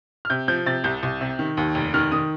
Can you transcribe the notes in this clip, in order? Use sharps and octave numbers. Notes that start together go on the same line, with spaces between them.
F6
C3 G6
F3 G6
C3 A6
C2 G6
C2
C3
D#3
D#2
F1
D#3 F6
D#3 D#6